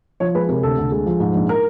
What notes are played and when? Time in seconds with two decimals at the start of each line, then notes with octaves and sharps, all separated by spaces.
0.20 F3 C#5
0.35 G#3 B4
0.49 C3 A#4
0.63 D2 A4
0.78 D2
0.92 G#3
1.06 F3
1.20 G#2
1.35 A#1
1.49 A#4